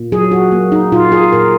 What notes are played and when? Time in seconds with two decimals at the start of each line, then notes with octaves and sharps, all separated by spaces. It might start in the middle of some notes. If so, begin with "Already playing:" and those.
Already playing: A#2
0.12 F#3 G#4
0.32 F#4
0.52 A#3
0.72 D#4
0.92 A#2 F4
1.12 G#4
1.32 A#2 A#4